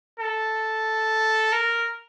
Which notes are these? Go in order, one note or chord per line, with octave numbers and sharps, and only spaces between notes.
A4
A#4